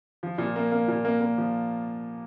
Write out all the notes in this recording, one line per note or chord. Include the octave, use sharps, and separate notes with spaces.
F3
A#2
A#3
A#3
A#2
A#3
A#3
F3